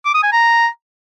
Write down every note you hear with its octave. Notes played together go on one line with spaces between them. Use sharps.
D6
D#6
G#5
A#5